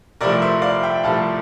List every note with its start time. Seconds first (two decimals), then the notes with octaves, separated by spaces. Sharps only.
0.21 C2 C3 F3 A3 A#4 D5
0.42 C5 E5
0.62 D5 F5
0.83 E5 G5
1.03 C2 C3 F3 A3 F5 A5